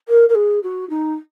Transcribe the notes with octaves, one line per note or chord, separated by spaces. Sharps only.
A#4
A#4
G#4
F#4
D#4